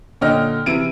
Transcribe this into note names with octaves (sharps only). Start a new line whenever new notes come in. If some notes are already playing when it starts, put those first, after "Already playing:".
A#2 D3 C#5 D#5 G5 F6
C3 E3 E4 D7 D#7